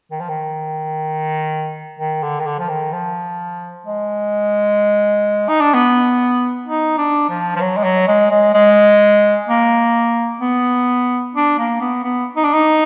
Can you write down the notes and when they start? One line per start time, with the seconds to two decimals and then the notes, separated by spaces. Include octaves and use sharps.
0.11 D#3
0.20 F3
0.29 D#3
1.99 D#3
2.23 D3
2.40 D#3
2.46 D3
2.59 F3
2.69 D#3
2.93 F3
3.86 G#3
5.49 D#4
5.61 D4
5.74 B3
6.66 D#4
6.98 D4
7.30 F3
7.56 F3
7.60 F#3
7.77 G#3
7.84 F#3
8.07 G#3
8.31 G#3
8.54 G#3
9.48 A#3
10.41 B3
11.35 D4
11.59 A#3
11.81 B3
12.04 B3
12.36 D#4
12.44 D4
12.53 D#4